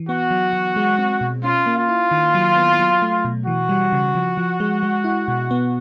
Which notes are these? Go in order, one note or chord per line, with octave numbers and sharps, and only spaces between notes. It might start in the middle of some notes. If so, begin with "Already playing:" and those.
Already playing: E3
B3 F#4
F#3
F#3
G#3
C4
B2
C#4 F4
A#3
F4
E4
D#3
F#3
B3
F#3
A3
B2
E3 F#4
G3
C#3
F3
F3
G#3
G#3
E4
B2
B3